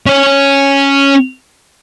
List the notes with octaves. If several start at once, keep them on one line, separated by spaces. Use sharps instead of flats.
C#4 C#5